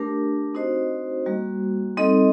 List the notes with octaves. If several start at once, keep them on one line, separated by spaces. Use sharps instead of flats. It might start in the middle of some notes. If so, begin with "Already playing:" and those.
Already playing: A3 D4 G4 A#4
C4 D#4 F#4 C5 D#5
G3 A#3 F#4
G3 C4 D#4 A4 D#5